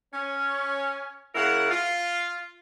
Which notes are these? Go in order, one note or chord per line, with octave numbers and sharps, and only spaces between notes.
C#4
C#3 A#3 E4 A#4 F#5
F4